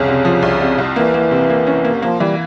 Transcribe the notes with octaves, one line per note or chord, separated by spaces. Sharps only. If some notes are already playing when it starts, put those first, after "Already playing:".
Already playing: C2 F2 C#3
C3
F3
C2
C3
C2
E3 A#3
A#3
C3
A#3
C#4
A#3
F3 A#3
E3 G3